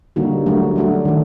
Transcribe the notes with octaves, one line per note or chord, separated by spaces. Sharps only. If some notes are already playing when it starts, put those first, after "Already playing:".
D3 G3 A#3 D#4 F#4
F#3 A3 D4 F#4
F#3 A3 D4 F#4
D#3 A3